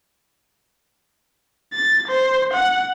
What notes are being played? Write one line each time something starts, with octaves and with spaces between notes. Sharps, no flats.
A6
C5
F#5